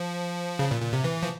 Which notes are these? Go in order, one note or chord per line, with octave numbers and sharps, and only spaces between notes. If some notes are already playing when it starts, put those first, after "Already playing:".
Already playing: F3
C#3
A#2
A#2
C3
E3
F3